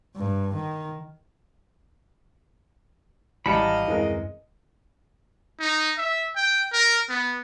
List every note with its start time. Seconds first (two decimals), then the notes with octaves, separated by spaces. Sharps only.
0.16 G2
0.54 D#3
3.46 G#1 E2 G3 D#5 F5 A5 B5 C#7
3.88 D#1 F#2 E3 G#3 C4 A#4
5.60 D#4
5.98 E5
6.36 G5
6.72 A#4
7.09 B3